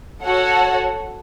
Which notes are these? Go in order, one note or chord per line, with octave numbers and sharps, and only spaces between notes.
F#4 A4 C#5 F#5